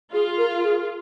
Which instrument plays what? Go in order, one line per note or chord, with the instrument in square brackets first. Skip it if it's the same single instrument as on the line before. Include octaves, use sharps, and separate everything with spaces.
[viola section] F4 [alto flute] G#4
[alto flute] A#4
G#4